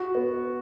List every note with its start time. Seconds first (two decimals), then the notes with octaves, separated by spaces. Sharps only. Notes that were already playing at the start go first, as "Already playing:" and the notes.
Already playing: F#4
0.15 B3